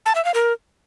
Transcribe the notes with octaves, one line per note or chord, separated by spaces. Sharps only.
A5
E5
F5
A#4